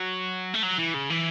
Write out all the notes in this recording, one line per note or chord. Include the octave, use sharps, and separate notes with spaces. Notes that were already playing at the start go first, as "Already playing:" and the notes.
Already playing: F#3
A3
F#3
E3
C#3
E3